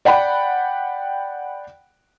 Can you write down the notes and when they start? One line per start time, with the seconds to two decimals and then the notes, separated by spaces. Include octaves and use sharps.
0.05 D5 F#5 G5 B5